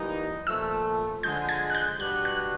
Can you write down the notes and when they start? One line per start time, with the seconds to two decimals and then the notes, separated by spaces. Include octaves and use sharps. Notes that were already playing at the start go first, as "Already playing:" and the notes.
Already playing: E3 G3 A#3 D#4
0.46 A#2 F3 A3 E6
1.23 D3 F3 G#3 G6
1.49 G#6
1.70 F#6
1.75 G6
1.99 B2 G3 B3 D4 F#4 F#6
2.25 F#6